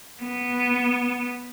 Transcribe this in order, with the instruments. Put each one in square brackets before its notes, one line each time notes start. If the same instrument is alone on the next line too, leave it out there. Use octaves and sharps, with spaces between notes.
[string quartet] B3